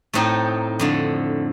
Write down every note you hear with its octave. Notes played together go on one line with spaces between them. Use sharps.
A2 A3 C4 D#4
F2 D3 A3